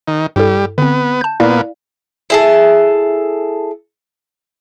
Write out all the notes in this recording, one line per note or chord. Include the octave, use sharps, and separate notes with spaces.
D#3
G2 G3 E4 A4
D3 B3 C4
A5 G6
A#2 B3 E4 D5 F5
E4 G#4 A4